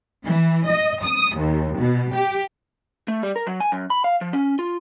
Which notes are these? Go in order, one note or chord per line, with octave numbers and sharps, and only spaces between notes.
E3
D#5
D#6
D#2
B2
G4
A3
G3
A#4
F#3
G#5
F#2
B5
F5
F3
C#4
F4